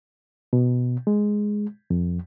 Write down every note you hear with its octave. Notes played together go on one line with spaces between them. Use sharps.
B2
G#3
F2